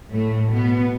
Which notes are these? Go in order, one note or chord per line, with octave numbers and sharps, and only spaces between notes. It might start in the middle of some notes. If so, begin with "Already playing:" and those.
A2 A3
B2 B3